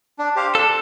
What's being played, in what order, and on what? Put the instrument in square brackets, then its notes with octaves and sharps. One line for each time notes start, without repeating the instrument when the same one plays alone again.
[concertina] D4
G4 C5 F5
[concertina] D4 [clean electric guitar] A4